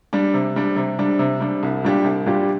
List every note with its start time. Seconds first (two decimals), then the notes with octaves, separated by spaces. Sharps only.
0.13 G3 D4
0.34 C3
0.56 G3 D4
0.76 C3
0.99 G3 D4
1.19 C3
1.40 G3 D4
1.63 C2
1.84 A#2 G3 D4 G4
2.04 C2
2.26 A#2 G3 D4 G4